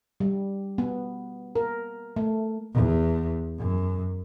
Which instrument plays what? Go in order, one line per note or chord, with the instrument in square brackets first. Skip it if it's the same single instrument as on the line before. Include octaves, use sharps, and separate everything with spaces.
[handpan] G3
B3
A#4
A3
[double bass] E2
F#2